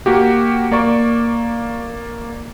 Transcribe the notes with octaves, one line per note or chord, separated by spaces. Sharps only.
A#3 F#4 G4
A#3 D5 C#6